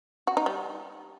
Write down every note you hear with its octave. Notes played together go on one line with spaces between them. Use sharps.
F#4
D#4
G3